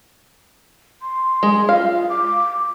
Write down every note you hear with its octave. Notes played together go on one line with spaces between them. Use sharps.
C6
G#3
F4 F5
D6